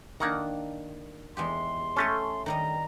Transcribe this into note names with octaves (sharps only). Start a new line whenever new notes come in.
D#3 A#3 D4 F#5 A#5
E2 G#3 G4 C6
A3 C#4 A4 D#5 A5
D#3 G3 D#5 A#5